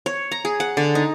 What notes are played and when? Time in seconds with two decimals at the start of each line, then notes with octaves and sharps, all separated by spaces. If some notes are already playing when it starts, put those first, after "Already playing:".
0.06 C#5
0.31 A#5
0.45 G#4
0.60 F#5
0.77 D3
0.95 D#4